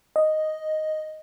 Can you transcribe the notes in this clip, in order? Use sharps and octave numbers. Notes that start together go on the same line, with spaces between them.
D#5